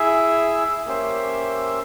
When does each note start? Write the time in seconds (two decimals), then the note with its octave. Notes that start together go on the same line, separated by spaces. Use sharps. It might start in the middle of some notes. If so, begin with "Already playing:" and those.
Already playing: E4 G#4 E5
0.86 A#3 C#4 G4 C5 E5